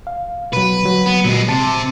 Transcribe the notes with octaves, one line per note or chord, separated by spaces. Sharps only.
F5
B2 F#3 B4
D3 F#3
B3
A#2 F#3 G#3
C3 A5